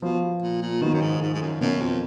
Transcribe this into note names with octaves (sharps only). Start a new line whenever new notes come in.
B2 F3
A#2
A#2
B2 D#3
F#2
G#2
G#2
G#2
F#2
F#2 B2
F2